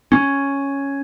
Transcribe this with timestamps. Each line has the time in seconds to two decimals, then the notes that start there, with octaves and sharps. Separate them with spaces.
0.12 C#4